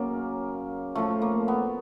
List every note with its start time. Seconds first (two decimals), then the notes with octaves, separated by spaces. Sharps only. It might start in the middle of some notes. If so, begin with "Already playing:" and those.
Already playing: F#2 C#3 F#3 A#3
0.95 A2 F3 A3
1.22 A#3
1.48 B3